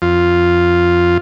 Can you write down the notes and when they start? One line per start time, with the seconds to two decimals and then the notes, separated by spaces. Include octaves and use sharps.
0.02 F2 F4